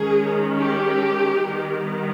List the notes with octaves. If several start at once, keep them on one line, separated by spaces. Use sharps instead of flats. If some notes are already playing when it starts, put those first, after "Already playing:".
Already playing: D#3 G#3 C#4 G#4
G4
D#3 G3 B3